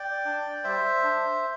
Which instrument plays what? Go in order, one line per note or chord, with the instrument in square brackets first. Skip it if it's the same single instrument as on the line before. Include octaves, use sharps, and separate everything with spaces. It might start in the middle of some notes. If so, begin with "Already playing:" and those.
Already playing: [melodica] D5 G5
D4
G3 C5 E5
D4